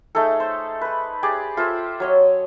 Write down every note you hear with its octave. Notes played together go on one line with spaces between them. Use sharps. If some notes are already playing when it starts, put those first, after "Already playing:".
A3 D#4 G#4 A4
C5
B4 B5
G4 G#4 D5
F4 A4 C5 E5
F#3 C#5 D#5